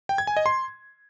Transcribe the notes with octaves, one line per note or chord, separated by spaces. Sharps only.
G5
G#6
G#5
D#5
C6